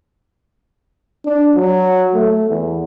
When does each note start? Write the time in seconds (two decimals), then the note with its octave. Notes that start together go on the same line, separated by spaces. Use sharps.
1.25 D4
1.55 F#3
2.14 A3
2.50 E2